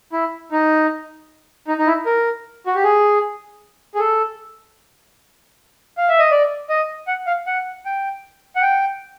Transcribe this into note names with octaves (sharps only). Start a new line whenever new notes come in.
E4
D#4
D#4
D#4
E4
A#4
F#4
G4
G#4
G#4
A4
F5
E5
D#5
D5
D#5
F#5
F5
F#5
G5
F#5
G5